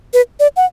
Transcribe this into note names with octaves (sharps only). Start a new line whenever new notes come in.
B4
D5
F#5